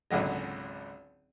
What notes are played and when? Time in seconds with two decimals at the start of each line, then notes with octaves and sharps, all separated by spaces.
0.11 G#1 C#2 D3 F#3 D#5